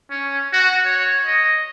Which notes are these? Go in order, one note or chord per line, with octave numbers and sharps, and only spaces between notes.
C#4
F#4
C#5
D#5